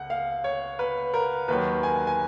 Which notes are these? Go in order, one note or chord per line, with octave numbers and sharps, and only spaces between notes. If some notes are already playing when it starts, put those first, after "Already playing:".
Already playing: C#2 F#5
F5
C#5
B4
A#4
D#2 D#3 F#3 B4
G#5
G#5